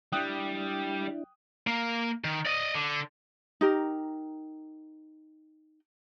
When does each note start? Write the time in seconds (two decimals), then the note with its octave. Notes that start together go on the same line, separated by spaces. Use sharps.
0.13 G3 D4 E4 G5 D#6 F#6
1.67 A#3
2.24 D#3
2.46 D5 D#5
2.74 D3
3.61 D#4 G4 A#4